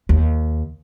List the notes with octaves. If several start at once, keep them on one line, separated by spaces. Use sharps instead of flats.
D#2